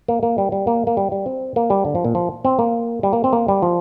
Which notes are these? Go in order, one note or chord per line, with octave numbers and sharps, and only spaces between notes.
A#3
A#3
G3
G3
A#3
A#3
G3
G3
C4
A#3
G3
D3
F3
A#2
F3
C4
A#3
G3
A#3
C4
A#3
G3
F3